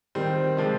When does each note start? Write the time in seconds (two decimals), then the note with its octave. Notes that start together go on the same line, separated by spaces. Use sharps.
0.15 D#3 G3 C4
0.57 C3 F3 G#3